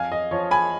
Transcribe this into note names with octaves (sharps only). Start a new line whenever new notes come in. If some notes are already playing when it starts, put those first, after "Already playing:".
Already playing: F2 F5 G#5
D#5
F3 C#5
G#5 B5